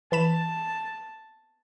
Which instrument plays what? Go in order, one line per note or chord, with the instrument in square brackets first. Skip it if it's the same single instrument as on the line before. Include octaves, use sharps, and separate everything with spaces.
[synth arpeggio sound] E3 B5 E7 [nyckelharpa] A5